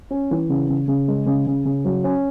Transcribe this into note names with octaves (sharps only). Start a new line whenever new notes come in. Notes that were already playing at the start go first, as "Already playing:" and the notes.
C#4
E3
C#3
C#3
C#3
G#3
C#3
C#3
C#3
F#3
C#4